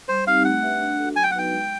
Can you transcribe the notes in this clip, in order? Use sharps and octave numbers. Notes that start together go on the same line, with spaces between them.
G3 C5
C4 D#4 G4 F5
A3 F#5
D4 G4 B4 E5
D4
F#4 A4
F#3 G#5
G5
F#5
B3 D#4 F#4 B4 G5
G#3